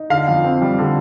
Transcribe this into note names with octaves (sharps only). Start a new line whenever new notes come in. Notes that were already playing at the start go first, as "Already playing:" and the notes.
Already playing: D#4
D3 F5
F2
C4
G3
D3